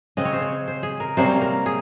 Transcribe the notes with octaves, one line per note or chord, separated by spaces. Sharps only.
C#3 G#3 C4 D#5
C#5
C5
C#5
C5
G#4
A#4
C3 G3 A#3 C#4 C5
A#4
G#4